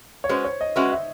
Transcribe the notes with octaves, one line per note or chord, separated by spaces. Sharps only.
C#5
G#3 C#4 F#4 B4 C5
C#5
D#5
G#3 C#4 F#4 B4 E5
E5